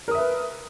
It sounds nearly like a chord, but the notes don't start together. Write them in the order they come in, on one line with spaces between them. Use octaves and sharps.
A#4 D#6 E5 B4